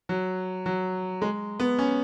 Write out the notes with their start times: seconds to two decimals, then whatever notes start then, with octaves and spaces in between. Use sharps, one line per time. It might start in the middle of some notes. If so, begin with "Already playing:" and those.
0.09 F#3
0.66 F#3
1.22 G#3
1.60 B3
1.79 C#4